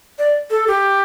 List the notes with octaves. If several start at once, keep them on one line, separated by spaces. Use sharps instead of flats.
D5
A4
G4